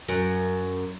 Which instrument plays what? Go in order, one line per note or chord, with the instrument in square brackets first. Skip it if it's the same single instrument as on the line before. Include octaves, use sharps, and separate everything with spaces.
[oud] F#2